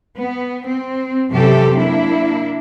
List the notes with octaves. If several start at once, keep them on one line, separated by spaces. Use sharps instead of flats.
B3
C4
F#2 C3 E3 G4 A4
A#3 D4 E4